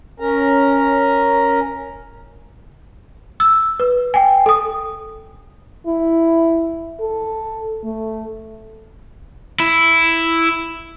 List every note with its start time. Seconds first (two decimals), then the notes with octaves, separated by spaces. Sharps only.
0.20 C#4 A#4 A#5
3.40 E6
3.80 B4
4.14 G5 G#5
4.46 A4 D#6
5.87 E4
7.00 A4
7.84 A3
9.60 E4